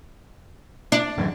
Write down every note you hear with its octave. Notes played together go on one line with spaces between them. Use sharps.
D4
D1 F#2 E3